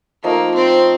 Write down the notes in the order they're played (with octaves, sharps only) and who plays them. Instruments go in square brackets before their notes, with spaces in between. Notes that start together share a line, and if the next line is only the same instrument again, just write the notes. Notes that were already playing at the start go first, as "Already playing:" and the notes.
[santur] F3 A3 D#4 [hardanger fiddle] A#3
[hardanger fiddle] C4